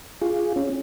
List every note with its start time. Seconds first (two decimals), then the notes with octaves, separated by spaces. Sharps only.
0.21 F4 G#4
0.56 C#4